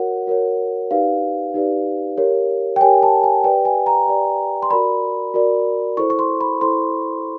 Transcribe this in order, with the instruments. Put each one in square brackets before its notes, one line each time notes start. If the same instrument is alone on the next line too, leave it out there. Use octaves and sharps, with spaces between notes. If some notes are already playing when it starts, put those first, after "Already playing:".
Already playing: [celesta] F#4 A#4 C#5 F#5
F#4 A#4 C#5
D#4 G4 B4 D5 F5
D#4 G4 B4 D5
G4 A#4 C#5
G5
G4 A#4 C#5 G#5
A5
G#5
G4 B4 D5 G5
G#5
A#5
G4 B4 D5
C6
F#4 A#4 D5 B5
F#4 A#4 D5
E4 A4 C5 C#6
C#6
C6
B5
E4 A4 C5 C6